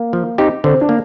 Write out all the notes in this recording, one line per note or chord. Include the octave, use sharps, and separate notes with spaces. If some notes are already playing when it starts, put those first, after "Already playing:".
Already playing: A#3
F3
C4 D#4 G4
D3 C4
D4
A#3